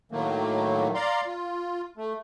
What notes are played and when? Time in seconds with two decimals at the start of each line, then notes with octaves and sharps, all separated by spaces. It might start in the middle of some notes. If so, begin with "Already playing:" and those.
0.12 A2 D#3 F#3 A3 A#3
0.95 D5 F5 A#5 C6
1.27 F4
1.97 A3